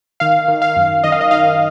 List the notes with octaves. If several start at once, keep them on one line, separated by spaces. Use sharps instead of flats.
D#3 F5
D#3
F5
F#2
D#3 D#5
F5
D#5
D#3 F5